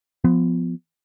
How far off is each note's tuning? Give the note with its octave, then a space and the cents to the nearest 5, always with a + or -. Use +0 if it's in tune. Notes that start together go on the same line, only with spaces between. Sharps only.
F3 +0 B3 +20